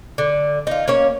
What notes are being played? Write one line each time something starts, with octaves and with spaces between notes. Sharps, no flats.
D3
D#4 F4
A#3 C#4 C#5